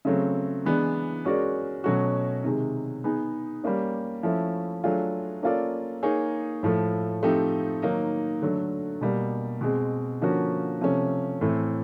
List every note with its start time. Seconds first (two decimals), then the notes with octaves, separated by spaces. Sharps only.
0.05 C#3 F#3 A3 C4
0.65 E3 G#3 B3 D4
1.25 G#3 C#4 F#4 A#4 D5
1.84 B2 F#3 A3 C#4 F#4
2.44 C3 D#3 G#3
3.04 B3 D#4 G#4
3.64 G3 A#3 C#4
4.23 F3 A3 C#4 E4
4.84 F#3 A3 D4 F4 G#4
5.43 A#3 C#4 F4 A4 D5
6.03 A#3 D#4 G#4 C#5
6.63 A2 F3 A3
7.23 F3 A3 C4 D#4 G4
7.82 D#3 F#3 A#3 D#4
8.42 D3 F#3 A3
9.01 B2 G3 A#3
9.61 B2 G#3 C4
10.21 D3 F3 A#3 C#4 F#4
10.81 C3 F3 A3 C#4
11.41 A2 E3 A3 C4